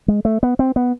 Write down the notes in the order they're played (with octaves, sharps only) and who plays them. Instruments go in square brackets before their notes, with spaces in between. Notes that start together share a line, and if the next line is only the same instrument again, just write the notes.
[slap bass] G#3
A3
B3
C4
B3